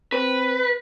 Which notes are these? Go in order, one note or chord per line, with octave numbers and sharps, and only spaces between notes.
C4 B4